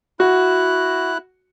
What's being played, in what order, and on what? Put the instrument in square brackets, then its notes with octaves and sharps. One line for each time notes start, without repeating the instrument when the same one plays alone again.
[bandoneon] E4 F#6 [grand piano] F#4